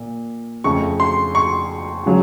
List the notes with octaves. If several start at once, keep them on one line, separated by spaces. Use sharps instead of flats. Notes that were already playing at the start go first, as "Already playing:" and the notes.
Already playing: A#2
F2 C#3 A3 C#6
C6
C#6
C#3 F#3